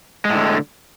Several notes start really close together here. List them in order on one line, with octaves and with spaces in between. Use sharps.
G#3 A2 D3